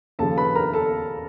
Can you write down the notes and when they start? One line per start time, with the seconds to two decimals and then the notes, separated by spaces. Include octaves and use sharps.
0.19 D#2 C#3 F3 A4 A5
0.37 B4 B5
0.55 A#4 A#5
0.73 A4 A5